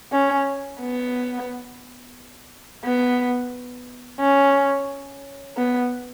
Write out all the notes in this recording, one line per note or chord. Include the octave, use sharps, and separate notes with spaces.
C#4
B3
B3
C#4
B3